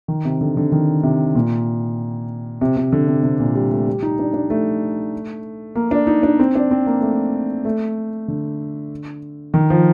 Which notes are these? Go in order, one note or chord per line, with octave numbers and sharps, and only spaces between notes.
D#3
C3
D3
D3
D#3
C3
A#2
C3
C3
D3
C3
C3
A#2
G3
A3
G3
D#4
D4
D4
A3
A#3
D4
D#4
D4
C4
D4
C4
A#3
A3
A3
D3
D#3
F3